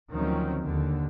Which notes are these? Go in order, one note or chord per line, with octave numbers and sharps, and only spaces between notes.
D2 D#3 F3 F#3 C4 C#4
D#2 D3